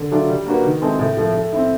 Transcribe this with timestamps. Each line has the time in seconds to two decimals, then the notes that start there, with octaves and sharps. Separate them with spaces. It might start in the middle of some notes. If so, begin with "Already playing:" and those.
Already playing: D3
0.11 F#3 A3 D4 F4
0.29 G3
0.46 A#3 D4 F#4 B4
0.64 D#3
0.81 G#3 C4 E4 A4
0.99 A2
1.17 F3 A3
1.35 A3
1.53 C4 E4